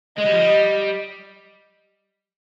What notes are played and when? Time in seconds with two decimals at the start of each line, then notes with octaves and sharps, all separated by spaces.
0.17 G#3 D#5
0.26 G3
0.33 F3
0.40 G3